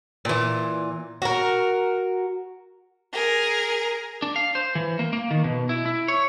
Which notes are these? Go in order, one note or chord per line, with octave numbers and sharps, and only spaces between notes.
A#2 E3
F#4 A#4
G#4 A#4
D4
F5
C5
E3
A#3
A#3
D#3
B2
E4
E4
C#5